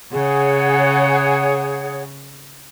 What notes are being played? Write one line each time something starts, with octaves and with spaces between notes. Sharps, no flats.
C#3 G#4 C#5 F#5